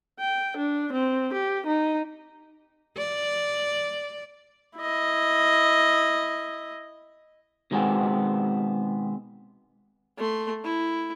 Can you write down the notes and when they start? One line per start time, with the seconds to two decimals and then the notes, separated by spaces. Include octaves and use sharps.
0.20 G5
0.58 D4
0.93 C4
1.34 G4
1.67 D#4
2.97 D5
4.78 E4 D#5
7.71 B2 D#3 G#3 B3 C4
10.17 A3 C6
10.64 E4